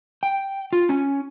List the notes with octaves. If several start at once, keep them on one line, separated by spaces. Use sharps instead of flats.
G5
F4
C#4